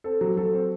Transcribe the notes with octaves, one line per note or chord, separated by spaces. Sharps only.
C4 A4
F#3
F#3 A4
C4